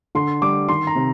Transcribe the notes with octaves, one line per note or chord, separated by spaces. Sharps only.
D3 C6
G3 D6
D#3 C6
A#5
C3